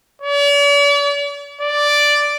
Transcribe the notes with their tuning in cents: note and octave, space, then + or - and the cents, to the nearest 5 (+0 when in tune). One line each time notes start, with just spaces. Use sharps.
D5 -45
D5 +0